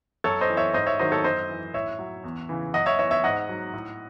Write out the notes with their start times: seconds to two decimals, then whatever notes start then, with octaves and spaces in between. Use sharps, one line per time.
0.24 F#2 A4 C#5
0.41 C5 D#5
0.49 E3
0.57 C#5 E5
0.74 G#2 C5 D#5
0.86 C#5 E5
0.99 D#3 F#3 C5 D#5
1.12 A4 C#5
1.24 F#2 C5 D#5
1.49 E3
1.74 A2 C#5 E5
1.99 F#3
2.24 E2
2.49 C#3 E3
2.74 F#2 D#5 F#5
2.86 C#5 E5
2.99 E3 C#5 E5
3.11 C#5 E5
3.24 G#2 D#5 F#5
3.49 F#3
3.73 A2